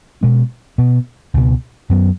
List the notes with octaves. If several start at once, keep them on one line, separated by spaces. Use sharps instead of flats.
B2 G#3 C#4
B2 B3
C#2 B2 B3
F#2 F#3 B3